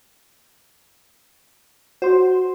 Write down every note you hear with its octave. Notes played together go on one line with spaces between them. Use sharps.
F#4 C5 C6